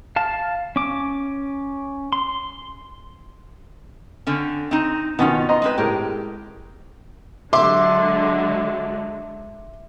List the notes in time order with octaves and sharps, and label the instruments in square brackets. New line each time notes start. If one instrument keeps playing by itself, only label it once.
[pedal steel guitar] F5 A5
C#4 D6
C6
[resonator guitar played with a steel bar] D3 C4 C#4
C4 D#4
[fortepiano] B2 D#3 [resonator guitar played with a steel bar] B3 C#4 F4
[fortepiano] D#5 A#5 C6
[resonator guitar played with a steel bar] G#3 C4 B4
[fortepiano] A2 G#3 A#4 [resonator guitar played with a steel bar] G4
[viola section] D3 F#3 G#3 [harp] E5 [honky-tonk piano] C6 D6